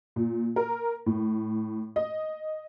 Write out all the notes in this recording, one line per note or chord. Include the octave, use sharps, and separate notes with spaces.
A#2
A#4
A2
D#5